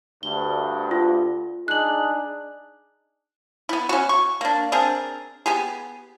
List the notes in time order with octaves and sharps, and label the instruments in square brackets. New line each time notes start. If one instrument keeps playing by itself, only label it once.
[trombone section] D2 G2 [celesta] G7
[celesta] F4
[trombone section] D4 D#4 G#4 [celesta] F#6 F#7
[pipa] B3 E4
C#4 F#4
C#6
A#3 D4
C4 D4 G#4 A#4
B3 G4 G#4